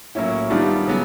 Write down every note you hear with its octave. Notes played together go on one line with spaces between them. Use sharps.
A2 F#3 A#3 C#4 E4
D#3 G3 B3 D4 F4
C#3 F#3 B3